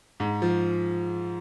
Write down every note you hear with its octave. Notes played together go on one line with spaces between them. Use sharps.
G#2
F3